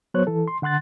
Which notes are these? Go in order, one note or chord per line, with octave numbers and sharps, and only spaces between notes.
F#3 B3 C5 C#5 F#6
E3 A4
C6
D3 F#5 C6 F#6 A6